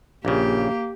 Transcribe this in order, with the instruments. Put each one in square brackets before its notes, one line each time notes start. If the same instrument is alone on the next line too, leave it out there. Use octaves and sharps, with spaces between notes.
[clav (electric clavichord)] A#1 C#3 [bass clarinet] A#3 [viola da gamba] G4